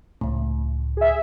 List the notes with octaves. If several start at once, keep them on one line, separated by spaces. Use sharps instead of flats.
C#2 A2
G#4 E5